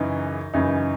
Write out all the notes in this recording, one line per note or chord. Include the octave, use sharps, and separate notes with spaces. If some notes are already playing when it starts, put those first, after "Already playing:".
Already playing: F#2 C#3 E3 D#4
F#2 C#3 E3 D#4